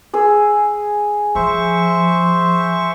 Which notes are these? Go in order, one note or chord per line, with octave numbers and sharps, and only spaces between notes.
G#4 G#5 E6
F3 C5 E5 C#6